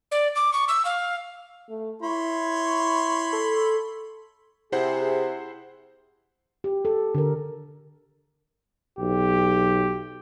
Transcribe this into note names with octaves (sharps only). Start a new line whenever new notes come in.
D5
D6
C#6
E6
F5
A3
E4 C#5 B5 C6
A4
C3 E4 G#4 C5 F#5
G4
A4
D3 A#4
B1 G4